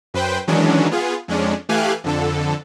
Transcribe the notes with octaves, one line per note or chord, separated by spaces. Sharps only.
F#2 B4 C5 G5
D#3 E3 F#3 G#3 C#4 D4
B3 F4 G#4
F2 G#3 C#4 D4
E3 A3 G4 F5 G#5 F#6
F2 D3 A4